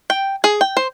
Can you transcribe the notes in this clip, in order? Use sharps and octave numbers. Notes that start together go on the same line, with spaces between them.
G5
G#4
G5
C5